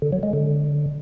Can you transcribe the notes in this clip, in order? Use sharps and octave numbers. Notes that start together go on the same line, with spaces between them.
D3
F#3
G#3
D3